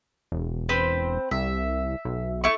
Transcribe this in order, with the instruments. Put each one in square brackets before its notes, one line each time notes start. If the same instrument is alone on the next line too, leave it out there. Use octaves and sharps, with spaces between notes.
[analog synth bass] E1
[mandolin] C4 B4 C5
[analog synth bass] C2 [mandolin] E5
[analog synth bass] B1
[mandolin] A3 E4 C#6